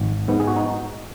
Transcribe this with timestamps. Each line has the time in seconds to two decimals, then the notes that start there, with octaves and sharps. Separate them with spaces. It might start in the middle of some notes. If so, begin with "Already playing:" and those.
Already playing: G#1
0.28 G#2 B3
0.40 G#4
0.48 F#4
0.56 D#4